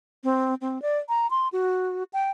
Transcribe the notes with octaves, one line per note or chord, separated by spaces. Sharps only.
C4
C4
D5
A#5
C6
F#4
G5